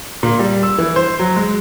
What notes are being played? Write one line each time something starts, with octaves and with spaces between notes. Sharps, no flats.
A#2
G3
E6
E3
C5
F#3
G#3